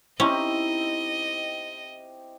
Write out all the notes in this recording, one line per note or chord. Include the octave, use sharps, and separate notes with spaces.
C4 C#4 D#4 E4 G4 D#5